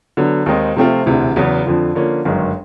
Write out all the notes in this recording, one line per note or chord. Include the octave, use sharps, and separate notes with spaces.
D3 F#3 B3
D#2 D#3 G#3 C4 D#4
C3 F3 A3 C4 F4
E1 D2 C3 E3
E2 C#3 F#3 B3
F2 D3 F3
D3 F3 A#3 C#4
G1 F#2 D#3 G#3